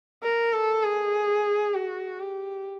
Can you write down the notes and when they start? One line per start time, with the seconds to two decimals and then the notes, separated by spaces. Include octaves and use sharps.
0.23 A#4
0.53 A4
0.84 G#4
1.75 F#4
2.20 G4